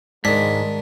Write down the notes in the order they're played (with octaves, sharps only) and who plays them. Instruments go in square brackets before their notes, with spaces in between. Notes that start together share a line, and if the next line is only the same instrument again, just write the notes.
[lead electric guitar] G#2 [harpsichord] D#3 D4 [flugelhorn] G#3 [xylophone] B6